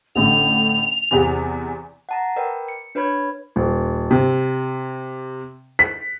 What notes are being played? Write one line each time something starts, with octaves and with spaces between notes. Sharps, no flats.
A1 A2 D3 F7
E2 C3 E3
F#5 A5 A#5
A#4 B4 D5 G5
C#7
D4 B4 C#5 B5 G#6
D#1
C3
B6